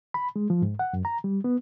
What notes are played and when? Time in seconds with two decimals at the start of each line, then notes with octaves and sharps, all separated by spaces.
0.14 B5
0.36 G#3
0.50 F3
0.62 G#2
0.79 F#5
0.93 F#2
1.05 A#5
1.24 G3
1.44 B3